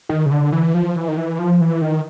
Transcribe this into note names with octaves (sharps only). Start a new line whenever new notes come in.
D#3
C#3
D3
E3
F3
E3
D#3
E3
F3
E3
D#3